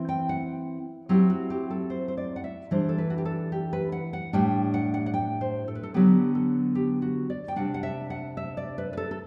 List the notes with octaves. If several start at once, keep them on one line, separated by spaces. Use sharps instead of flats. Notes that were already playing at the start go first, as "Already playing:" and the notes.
Already playing: E3 C4 E4
G5
F#5
F#3 C4 E4 G4
F#4
G4
A4
C5
C5
D5
F#5
E5
E3 G3 D4 C5
A4
B4
F#4
G4
A4
G4
B4
F#5
F#5
A2 G3 D4 G5
F#5
F#5
F#5
G5
C5
A4
B4
A4
D3 F#3 B3 G4
A4
G4
F#4
D5
G5
C3 G3 D4 F#5
F#5
E5
F#5
E5
D5
B4
B4
A4
A4